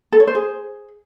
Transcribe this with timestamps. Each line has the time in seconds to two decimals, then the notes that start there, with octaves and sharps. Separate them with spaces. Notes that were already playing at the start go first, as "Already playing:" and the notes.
0.12 A4
0.20 C#5
0.27 C5
0.35 G#4